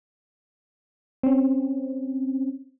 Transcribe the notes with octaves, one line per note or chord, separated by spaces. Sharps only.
C4 C#4